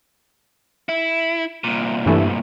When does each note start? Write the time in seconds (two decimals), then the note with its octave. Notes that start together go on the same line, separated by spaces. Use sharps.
0.89 E4
1.64 C2 A#2
2.06 G2 E3 A3